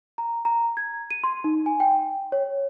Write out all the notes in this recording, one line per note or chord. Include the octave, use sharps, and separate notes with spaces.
A#5
A#5
G#6
D#7
C6
D#4
G#5
G5
C#5